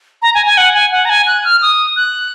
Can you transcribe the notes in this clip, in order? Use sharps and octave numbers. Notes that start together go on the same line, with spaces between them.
A#5
G#5
G#5
F#5
G#5
F#5
A#5
G#5
F#6
F6
D#6
F#6